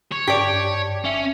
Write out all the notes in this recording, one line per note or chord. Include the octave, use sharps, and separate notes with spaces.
C#5
G2 G4 D5 A5
G1 C#4 E5 C#7